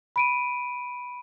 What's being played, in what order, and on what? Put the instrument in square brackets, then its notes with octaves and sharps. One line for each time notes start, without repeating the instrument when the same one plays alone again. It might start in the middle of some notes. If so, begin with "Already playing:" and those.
[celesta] B5 D7 D#7